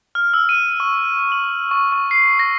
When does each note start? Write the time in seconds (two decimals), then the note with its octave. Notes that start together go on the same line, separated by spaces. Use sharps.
0.15 F6
0.34 E6
0.49 D#7
0.80 C#6
1.32 F#7
1.71 C#6
1.92 C#6
2.11 C7
2.39 A#6